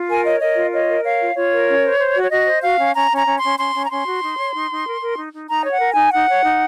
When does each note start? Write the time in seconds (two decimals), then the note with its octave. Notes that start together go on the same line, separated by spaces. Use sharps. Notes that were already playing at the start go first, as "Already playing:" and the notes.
Already playing: F4
0.09 A#4 G#5
0.24 C#5 D#5
0.40 A#4 D#5
0.56 F4
0.72 C#5 D#5
0.88 A#4
1.04 C#5 F5
1.20 F4
1.35 F4 C#5
1.52 A#4
1.68 C#4
1.84 C5
1.99 C5
2.15 F#4
2.23 C#5
2.31 F#4 D#5
2.47 C5
2.63 F#4 F5
2.79 C#4
2.95 C#4 A#5
3.11 C#4 A#5
3.26 C#4
3.37 C6
3.43 C#4
3.58 C#4 C6
3.74 C#4
3.85 A#5
3.90 C#4 C6
4.06 F#4
4.22 D#4
4.38 C#5
4.54 D#4
4.70 D#4
4.86 A#4
5.01 A#4
5.17 D#4
5.33 D#4
5.48 D#4 A#5
5.65 C#5 F#5
5.80 A#4
5.91 D#4 G#5
6.12 D#4 F#5
6.29 C#5
6.44 D#4